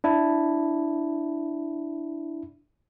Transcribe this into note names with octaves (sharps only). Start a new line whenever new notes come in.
D4 E4